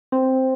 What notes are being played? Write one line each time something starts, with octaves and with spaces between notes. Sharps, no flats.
C4